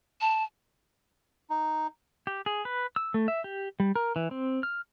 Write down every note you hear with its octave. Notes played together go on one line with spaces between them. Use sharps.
A5
D#4
G4
G#4
B4
E6
A3
E5
G4
G3
A#4
E3
C4
F6